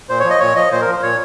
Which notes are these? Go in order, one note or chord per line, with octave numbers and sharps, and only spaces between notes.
A#2 C5
C#5
F3
D#5
A#2 C#5
F3 D#5
A#2 C5
A#4
F3
C5
A#2 C#5